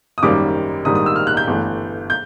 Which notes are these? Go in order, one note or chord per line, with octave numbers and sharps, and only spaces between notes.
D#6
G#1 F#2 D#3 G3 A#3 D6
A#1 G#2 D#3 G3 D#6
D#6
E6
F6
F#6
G6
G1 G2 E3 A3
G6